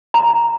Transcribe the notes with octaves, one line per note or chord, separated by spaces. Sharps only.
A#5